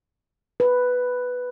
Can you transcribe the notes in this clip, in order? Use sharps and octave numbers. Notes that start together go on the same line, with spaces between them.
B4